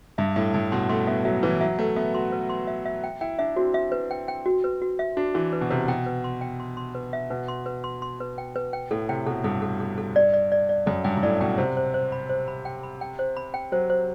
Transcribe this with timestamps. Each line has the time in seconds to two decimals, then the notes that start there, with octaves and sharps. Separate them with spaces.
0.18 G2 E5
0.36 A2 E5
0.54 G2 A5
0.72 B2 C6
0.89 A3 C6
1.07 B3 E5
1.25 F#3 E5
1.43 E3 B4
1.61 F#3 E5
1.79 A3 B4
1.96 B3 E5
2.14 F#4 C6
2.32 B4
2.49 C6
2.67 E5
2.85 E5
3.04 G5
3.21 E4 G5
3.39 D4 E5
3.56 C4 F#4
3.74 E5
3.92 B4
4.11 G5
4.28 G5
4.46 F#4
4.64 B4
4.82 F#4
4.99 E5
5.17 D4 F#4
5.34 E3 F#4
5.53 B4
5.61 B2
5.70 C3 B4
5.88 B2 G5
6.06 B4
6.24 C6
6.41 G5
6.60 C6
6.77 C6
6.95 B4
7.13 E5
7.30 B2 B4
7.48 C6
7.66 B4
7.84 C6
8.02 C6
8.20 B4
8.38 G5
8.56 B4
8.73 G5
8.91 A2 A4
9.09 C3 G5
9.26 B2 A4
9.44 G2 A4
9.62 A4
9.80 A4
9.98 A4
10.16 D5
10.34 D5
10.52 D5
10.69 D5
10.86 F#2 A4
11.04 G2 G5
11.17 G2
11.23 A2 D5
11.40 B2 G5
11.58 C3 C5
11.77 C5
11.94 C5
12.12 B5
12.29 C5
12.48 B5
12.65 G5
12.83 B5
13.01 G5
13.19 C5
13.37 B5
13.54 G5
13.72 F#3 C5
13.90 C5